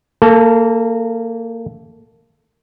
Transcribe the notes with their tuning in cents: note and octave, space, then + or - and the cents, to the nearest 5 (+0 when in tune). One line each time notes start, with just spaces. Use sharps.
A#3 -25 A4 +0